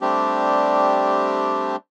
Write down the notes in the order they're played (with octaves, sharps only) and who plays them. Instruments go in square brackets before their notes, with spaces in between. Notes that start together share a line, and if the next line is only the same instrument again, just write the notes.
[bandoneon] G3 A3 C4 D4 G4